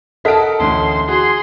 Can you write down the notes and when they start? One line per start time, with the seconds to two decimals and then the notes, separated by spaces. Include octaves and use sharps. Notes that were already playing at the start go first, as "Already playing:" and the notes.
0.25 A4 A#4 D#5 F#5 A5 B6 D7
0.60 A1 D2 C6
1.08 F#4 G#4 C6